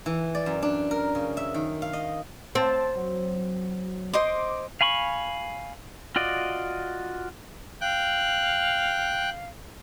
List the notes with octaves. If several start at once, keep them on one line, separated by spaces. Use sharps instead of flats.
E3
D5
F#2
D4
A#4
C#3
E5
D#3
F5
D#5
C4 A5
F#3
C5 D#5 C6 D6
F5 G#5 B5 C#6
F4 F#4 D5 D#5
F5 G5 F#6